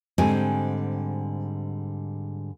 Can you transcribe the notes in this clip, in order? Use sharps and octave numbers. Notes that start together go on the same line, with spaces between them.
G#2 D3 G3 G#3 C4 G#5